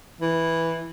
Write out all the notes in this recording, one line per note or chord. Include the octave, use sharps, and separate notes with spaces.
E3